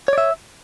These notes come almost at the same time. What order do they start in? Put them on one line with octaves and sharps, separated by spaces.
C#5 D5 E5